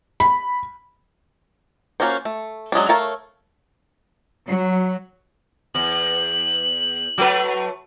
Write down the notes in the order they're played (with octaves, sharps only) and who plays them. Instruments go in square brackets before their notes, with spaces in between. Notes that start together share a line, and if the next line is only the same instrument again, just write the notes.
[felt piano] B5
[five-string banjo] A#3 C#4 F4 F#4 C5
A3
F#3 G#3 C#4 D4
A3 A#4 C#5 F5 A5
[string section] F#3
[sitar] E2 [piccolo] F#7
[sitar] F#3 A3 B4